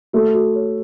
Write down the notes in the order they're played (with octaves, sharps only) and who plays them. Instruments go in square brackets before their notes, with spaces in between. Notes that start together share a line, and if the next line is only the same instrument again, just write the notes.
[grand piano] A3 [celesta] F#4
[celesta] F#4
C#5